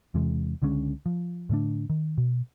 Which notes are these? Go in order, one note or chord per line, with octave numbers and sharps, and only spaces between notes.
E2 C3 E3 G#3
C#2 D3 G#3 C#4
F3
A2 D3 A3 D4
D#3
B2